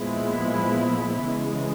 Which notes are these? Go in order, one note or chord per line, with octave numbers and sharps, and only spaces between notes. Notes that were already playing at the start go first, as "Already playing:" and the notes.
Already playing: A#2 F3 G#3 B3 E4
C#3 E3 G#3